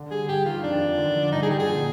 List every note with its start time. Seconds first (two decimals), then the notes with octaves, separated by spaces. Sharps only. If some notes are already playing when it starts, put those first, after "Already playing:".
Already playing: D3
0.11 G3 G#4
0.28 G2 G4
0.46 D#3 F4
0.63 F2 D4
0.81 D#3
0.98 D3
1.16 F3
1.32 G2 D#4
1.43 G#4
1.50 D3 G4
1.59 G#4
1.68 A#2